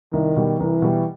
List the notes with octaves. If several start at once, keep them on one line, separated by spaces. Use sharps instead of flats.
C2 D#3
B2 G3
C2 E3
B2 G3